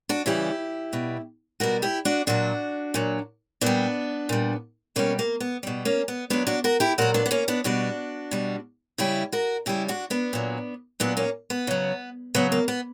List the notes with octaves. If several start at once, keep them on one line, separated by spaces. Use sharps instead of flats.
D4 F#4
C#3 E3 G3 E4 G4
B2 G3
B2 G3 F#4 A#4
E4 G4
D4 F#4
A#2 F#3 D4 F#4
A#2 F#3
A#2 G3 B3 D4
A#2 G3
B2 G3 A#3 C#4
A#3
B3
B2 G3
A#3 C#4
B3
A#2 F#3 B3 D4
D4 F#4
F#4 A#4
E4 G4
A#2 F#3 F#4 A#4
B3 D4
B3
A#3 C#4
B3 D4
B2 G3 D4 F#4
B2 G3
C#3 G3 E4 G4
F#4 A#4
C#3 G3 E4 G4
D4 F#4
B3 D4
A#2 F#3
A#2 F#3 B3 D4
A#3 C#4
B3
C#3 F#3
C#3 F#3 B3
A#3
B3